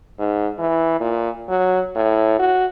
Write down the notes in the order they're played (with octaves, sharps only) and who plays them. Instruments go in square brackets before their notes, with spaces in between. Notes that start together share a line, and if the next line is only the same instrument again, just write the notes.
[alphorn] G#2
E3
A#2
F#3
A2
F#4